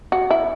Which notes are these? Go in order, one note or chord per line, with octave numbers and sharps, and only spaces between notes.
F#4
E4